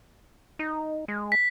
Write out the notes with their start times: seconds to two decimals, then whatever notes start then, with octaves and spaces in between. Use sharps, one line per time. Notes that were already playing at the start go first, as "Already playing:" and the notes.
0.59 D#4
1.08 G#3
1.32 B6